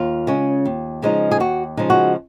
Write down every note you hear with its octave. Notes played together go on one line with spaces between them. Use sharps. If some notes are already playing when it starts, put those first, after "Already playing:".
Already playing: D#2 F4
C#3 G#3 C#4
D#2
C#3 F3 G#3 D#4
G#4
D#2 F#4
C#3 F3 G#3 D#4
F#4